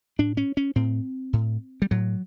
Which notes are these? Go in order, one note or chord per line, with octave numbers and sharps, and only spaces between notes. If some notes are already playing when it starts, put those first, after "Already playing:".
A2 D4
C#4
C#4
A2 C4
A2
G3
A2 F#3